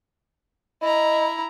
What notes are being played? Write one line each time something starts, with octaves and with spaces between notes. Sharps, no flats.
E4 D#5 A#5